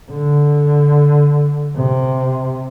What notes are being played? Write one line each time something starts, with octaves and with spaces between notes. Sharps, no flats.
D3
C3